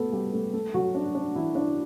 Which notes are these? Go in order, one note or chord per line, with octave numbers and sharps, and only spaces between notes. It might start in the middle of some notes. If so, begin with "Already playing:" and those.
Already playing: A3 B3 F#4 A4 B4
G3 G4
A3 A4
A3 A4
F#3 F#4
D4
D4
E3 E4
D4